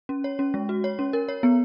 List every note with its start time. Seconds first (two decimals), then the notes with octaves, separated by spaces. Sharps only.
0.09 C#4
0.24 C#5
0.39 C#4
0.54 G#3
0.69 F#4
0.84 C#5
0.99 C#4
1.13 A#4
1.29 C#5
1.43 B3